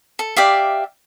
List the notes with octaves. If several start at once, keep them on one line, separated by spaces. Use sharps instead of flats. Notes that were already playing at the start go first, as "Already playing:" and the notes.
A4
G4 D5 E5 F5